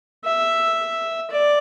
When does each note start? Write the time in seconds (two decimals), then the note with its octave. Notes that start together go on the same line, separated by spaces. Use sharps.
0.25 E5
1.30 D5